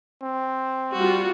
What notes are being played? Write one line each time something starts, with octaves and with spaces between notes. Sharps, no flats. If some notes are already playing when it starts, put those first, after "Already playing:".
C4
G3 F4 F#4